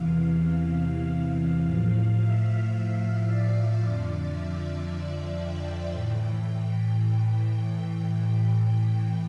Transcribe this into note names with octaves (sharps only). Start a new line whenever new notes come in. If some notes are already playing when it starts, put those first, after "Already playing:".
Already playing: E2 C3 E3 F5
F5
A2 F3
E5
D5
F2 D3 F3
E5
G5
A2 E3